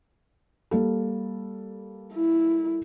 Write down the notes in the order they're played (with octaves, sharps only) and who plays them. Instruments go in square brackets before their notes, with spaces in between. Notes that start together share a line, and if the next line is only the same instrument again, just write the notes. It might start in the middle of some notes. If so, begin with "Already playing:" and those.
[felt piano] G3 A#3 A4
[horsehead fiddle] E4